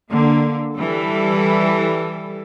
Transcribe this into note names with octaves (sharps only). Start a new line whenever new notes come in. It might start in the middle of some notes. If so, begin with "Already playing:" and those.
D3 A#3
E3 G3 A4